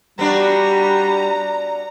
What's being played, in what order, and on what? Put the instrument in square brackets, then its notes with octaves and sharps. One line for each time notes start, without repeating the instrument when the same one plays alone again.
[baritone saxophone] G3 [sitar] B3 D4 F#4 [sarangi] A#5